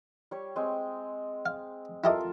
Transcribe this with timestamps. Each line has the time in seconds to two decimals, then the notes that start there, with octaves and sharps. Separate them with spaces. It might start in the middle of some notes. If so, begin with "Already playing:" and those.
0.31 G3 C#5
0.56 G#3 C4
1.46 F5
2.04 E4 F4 G4 A4 A#4 D#5